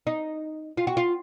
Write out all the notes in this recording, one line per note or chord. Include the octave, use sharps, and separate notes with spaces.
D#4
F4
F#4
F4